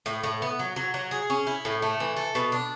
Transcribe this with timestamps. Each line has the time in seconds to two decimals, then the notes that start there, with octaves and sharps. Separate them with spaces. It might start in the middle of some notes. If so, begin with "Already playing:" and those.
0.06 A2
0.23 A2
0.42 B3
0.59 F#3
0.76 F#3
0.94 F#3
1.11 G#4
1.30 C#4
1.47 E4
1.65 A2
1.82 A3
2.00 E3
2.17 A4
2.35 B2
2.52 D4